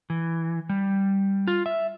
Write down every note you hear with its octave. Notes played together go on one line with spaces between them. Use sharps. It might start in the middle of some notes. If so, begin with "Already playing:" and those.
E3
G3
F4
E5